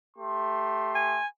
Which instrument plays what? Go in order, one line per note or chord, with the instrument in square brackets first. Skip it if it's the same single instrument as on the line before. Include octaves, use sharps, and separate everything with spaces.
[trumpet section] A3 G4 C6
[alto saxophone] G#5